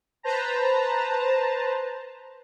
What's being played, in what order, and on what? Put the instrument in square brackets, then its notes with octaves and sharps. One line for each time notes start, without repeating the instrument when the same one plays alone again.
[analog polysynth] B4 C5 A5 A#5